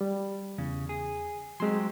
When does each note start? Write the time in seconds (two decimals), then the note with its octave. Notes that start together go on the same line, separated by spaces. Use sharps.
0.01 G3
0.58 E2 C#3
0.89 G#4
1.60 F#3 G#3 C4 G4 C6